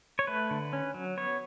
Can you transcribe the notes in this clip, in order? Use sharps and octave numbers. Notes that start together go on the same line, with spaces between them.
C#5
A3 B4
D3
C#4
F#3
B3 C#5